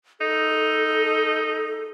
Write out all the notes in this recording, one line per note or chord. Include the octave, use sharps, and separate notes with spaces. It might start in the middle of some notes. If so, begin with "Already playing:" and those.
D#4 A4